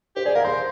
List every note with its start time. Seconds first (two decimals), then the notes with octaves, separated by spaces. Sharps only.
0.16 G4 C5
0.25 G#4 D5
0.35 A#4 F5
0.44 C5 C6